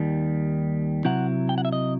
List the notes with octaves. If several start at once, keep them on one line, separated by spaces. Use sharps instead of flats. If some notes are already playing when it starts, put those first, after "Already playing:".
Already playing: D#2 D#3 G3
C3 F#3 C4 E4 F#5
G5
F#5
E5
D#5